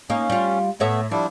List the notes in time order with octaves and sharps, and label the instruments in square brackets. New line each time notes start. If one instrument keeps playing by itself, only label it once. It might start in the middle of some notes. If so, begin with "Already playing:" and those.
[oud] A#3 D#4 [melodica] C#4
[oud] G3 F4
[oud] A2 C#5 E5 [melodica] A3 B3
[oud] F3 [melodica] G3 D4 E4